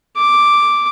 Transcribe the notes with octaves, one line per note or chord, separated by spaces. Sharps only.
D6